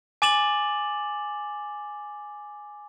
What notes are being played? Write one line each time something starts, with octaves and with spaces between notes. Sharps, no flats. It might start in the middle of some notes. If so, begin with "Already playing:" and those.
G#5 D6 A6 E7 F#7